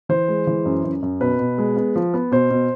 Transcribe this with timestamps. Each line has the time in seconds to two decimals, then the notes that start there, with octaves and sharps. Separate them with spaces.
0.09 E3 C5
0.28 G#3
0.47 E3
0.65 F#2
0.84 F#2
1.02 F#2
1.21 B2 B4
1.39 B2
1.58 G#3
1.77 B3
1.96 F3
2.14 B3
2.32 B2 C5
2.50 B2